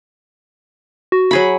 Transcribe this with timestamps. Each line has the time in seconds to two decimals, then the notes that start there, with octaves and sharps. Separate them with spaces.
1.12 F#4
1.31 F#3 G#4 B5